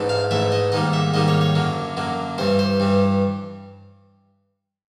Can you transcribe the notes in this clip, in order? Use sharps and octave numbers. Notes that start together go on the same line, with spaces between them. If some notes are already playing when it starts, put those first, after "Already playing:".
Already playing: A1 G#2 E3 A3
F5
A1 G#2 E3 A3 E5
D#5
G#2 D#3 G3 A#3 D#5
E5
G#2 D#3 G3 A#3 D#5
C#5
C#5
F#2 D3 F#3 A#3
F#2 D3 F#3 A#3
G2 E3 G3 C5
C5
G2 E3 G3